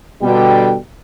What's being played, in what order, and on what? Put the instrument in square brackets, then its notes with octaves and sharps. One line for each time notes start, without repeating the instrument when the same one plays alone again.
[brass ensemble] B2 D3 G3 G5